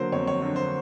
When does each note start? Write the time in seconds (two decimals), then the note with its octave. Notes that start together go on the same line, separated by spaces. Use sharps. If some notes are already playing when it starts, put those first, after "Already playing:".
Already playing: D3 F#3 A#3 C5
0.12 F2 C#5
0.27 C#5
0.42 D3 F#3 A#3
0.56 C5